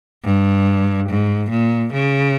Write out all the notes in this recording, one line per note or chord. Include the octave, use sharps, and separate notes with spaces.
G2
G#2
A#2
C#3